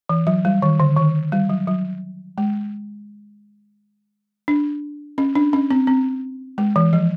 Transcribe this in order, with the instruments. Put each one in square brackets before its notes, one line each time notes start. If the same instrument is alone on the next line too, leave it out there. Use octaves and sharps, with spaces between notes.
[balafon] E3
F#3
G3
D#3
D3
D#3
G3
F#3
F#3
G#3
D4
C#4
D4
C#4
C4
C4
G#3
E3
F3